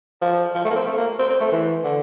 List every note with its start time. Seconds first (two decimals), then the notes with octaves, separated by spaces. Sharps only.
0.22 F3
0.55 F3
0.65 A3
0.71 A#3
0.76 C4
0.87 A3
0.98 A#3
1.19 C4
1.30 C4
1.41 A3
1.52 E3
1.84 D3